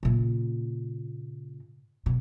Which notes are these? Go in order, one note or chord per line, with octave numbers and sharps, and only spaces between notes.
A#2 C#3
B2